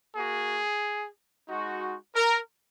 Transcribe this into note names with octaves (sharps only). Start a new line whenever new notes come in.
A#3 F#4 G#4
G#3 D#4 F#4
A#4